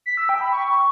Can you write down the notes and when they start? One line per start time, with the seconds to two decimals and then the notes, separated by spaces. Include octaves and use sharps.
0.06 B6
0.17 E6
0.29 G5
0.41 B5
0.53 C#6